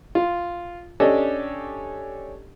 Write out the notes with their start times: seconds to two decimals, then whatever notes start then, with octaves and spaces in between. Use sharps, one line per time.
0.15 F4
1.00 C#4 D4 G4 A4 D#5